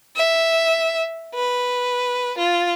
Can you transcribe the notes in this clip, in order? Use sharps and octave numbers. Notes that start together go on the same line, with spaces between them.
E5
B4
F4